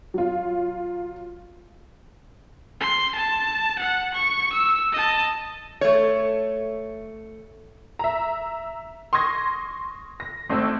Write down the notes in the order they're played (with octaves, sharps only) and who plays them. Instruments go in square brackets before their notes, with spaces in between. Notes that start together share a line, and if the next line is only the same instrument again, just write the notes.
[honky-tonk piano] F#3 F4
[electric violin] C6
A5
F#5
C#6
E6
D#5 A5
[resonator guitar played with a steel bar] A3 C#5
[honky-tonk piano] E5 A#5
C6 C#6 D#6 G#6 A#6
A#6
G#1 A3 C4 E6